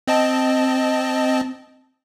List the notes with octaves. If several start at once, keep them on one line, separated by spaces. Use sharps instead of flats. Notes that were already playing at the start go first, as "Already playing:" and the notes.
C4 D#5 A5